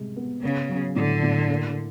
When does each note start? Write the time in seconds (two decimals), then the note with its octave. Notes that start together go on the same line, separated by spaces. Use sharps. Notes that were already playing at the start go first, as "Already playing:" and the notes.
Already playing: C3 G#3
0.16 B3
0.42 C#3 B3
0.69 F#3
0.96 A2 D3
1.23 A2
1.49 A#3